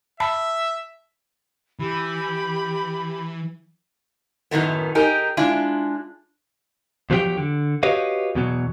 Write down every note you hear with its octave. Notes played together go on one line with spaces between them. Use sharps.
E5 A5 B5
E3 G4 B5
F#2 A2 D#3 B3
D#4 G4 G#4 A#4
G#3 D4 E4 F4
E2 F3 F#3 D4 G4 G5
D3
F#4 G4 B4 C#5 D#5 F5
E2 B2 F#3